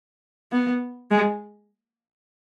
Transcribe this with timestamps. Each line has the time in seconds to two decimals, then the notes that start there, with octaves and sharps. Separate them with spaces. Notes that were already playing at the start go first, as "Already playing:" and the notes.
0.52 B3
1.11 G#3